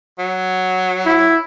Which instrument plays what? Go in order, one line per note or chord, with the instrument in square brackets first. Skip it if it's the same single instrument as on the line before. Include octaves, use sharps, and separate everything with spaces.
[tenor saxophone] F#3
[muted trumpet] E4